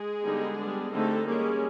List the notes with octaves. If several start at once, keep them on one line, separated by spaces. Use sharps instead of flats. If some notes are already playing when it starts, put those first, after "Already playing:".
Already playing: G#3 G#4
D3 G3 B3 D#4
G3 B3 D4
D3 G3 A3 C4 D#4 A4
G3 G#3 A#3 C#4 G#4